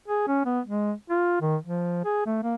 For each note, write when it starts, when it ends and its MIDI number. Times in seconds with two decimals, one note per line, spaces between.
0.08 0.23 68
0.27 0.43 61
0.46 0.60 59
0.65 0.92 56
1.10 1.40 65
1.41 1.56 51
1.64 2.01 53
2.05 2.26 68
2.27 2.41 57
2.43 2.55 58